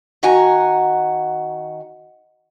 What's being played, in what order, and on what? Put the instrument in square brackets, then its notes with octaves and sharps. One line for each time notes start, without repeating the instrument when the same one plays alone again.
[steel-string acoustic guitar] D#3 F#4 F#5 G#5 A#5